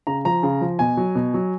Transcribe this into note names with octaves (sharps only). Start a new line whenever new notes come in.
C#3 A#5
F3 A#5
C#3
F3
B2 G#5
F#3
B2
F#3